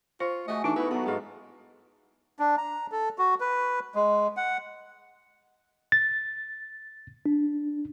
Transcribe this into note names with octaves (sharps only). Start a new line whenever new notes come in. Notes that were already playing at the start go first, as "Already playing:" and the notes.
F4 C5 C#6
A3 F#4 G#4 D#5
E3 A3 D4 D#4
B3 E4 F#4 B4
F#3 B3 F#4 A4
G#2 G#3 F4
D4
A#5
A4
F#4
B4
G#3
F#5
A6
D4